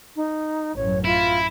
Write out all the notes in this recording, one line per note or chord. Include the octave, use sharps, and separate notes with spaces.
D#4
A1 F#2 C#5
E4 F4